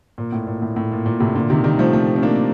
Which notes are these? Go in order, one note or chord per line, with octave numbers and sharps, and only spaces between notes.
A#2
A2
A#2
A2
A2
A#2
A#2
A2 C3
A#2 D3
C3 D#3
D#3 G3
F3 A3
A3 C4
C4
A#3 D4